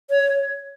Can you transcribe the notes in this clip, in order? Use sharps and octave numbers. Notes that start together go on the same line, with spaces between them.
C#5